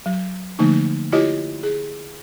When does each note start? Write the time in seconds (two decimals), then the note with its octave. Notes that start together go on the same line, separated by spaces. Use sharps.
0.06 F#3
0.59 D3 F3 A3 A#3 D#4
1.12 E4 F4 G4 C#5 D#5
1.63 G#4